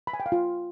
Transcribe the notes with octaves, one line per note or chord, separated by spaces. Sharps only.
B5
G#5
G5
F5
F4